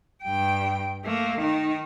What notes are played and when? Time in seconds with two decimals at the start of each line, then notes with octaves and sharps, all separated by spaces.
0.24 G2 G5
1.04 A3 A#3
1.39 D#3 D#4